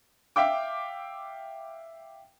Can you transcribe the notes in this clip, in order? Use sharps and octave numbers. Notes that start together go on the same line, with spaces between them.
E5 F5 G5 D6